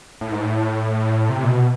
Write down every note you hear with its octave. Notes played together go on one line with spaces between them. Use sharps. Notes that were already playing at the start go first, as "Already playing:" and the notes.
A2
G#2
A2
C3
A#2
B2